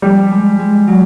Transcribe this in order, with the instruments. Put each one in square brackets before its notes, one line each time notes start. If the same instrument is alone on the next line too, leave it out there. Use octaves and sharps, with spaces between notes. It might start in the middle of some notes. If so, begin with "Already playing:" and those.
[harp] F3 [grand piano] G3
[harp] G#3
G#3
F#3